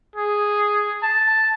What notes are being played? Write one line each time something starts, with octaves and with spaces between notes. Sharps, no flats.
G#4
A5